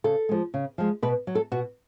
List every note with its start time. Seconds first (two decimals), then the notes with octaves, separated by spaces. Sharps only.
0.04 C#3 A4
0.29 F3 G#3
0.54 C#3
0.78 F3 G#3
1.02 B2 B4
1.27 F#3
1.35 A4
1.51 B2 F#4